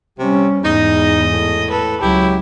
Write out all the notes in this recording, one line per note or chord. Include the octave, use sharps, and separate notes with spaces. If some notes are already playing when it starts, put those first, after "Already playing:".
C3 G3 C#4
E2 G#2 D#4 D#5
A2
A4 B4
C#2 F#3 E4 G4